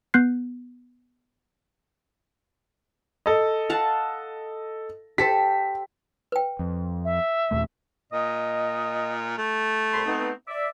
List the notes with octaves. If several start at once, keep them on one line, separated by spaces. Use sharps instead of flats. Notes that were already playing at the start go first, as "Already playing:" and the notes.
B3 F#6 G6 C7
A4 D#5
F5 F#5 A5
G4 A4 C5 B6
B4 G5
F2
E5
D#2 A#2 A3
A#2 D#5
A3
C2 B5 C6
B3 C4 D#4
D5 E5